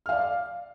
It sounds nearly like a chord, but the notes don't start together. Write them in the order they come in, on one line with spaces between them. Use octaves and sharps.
F6 F5 D5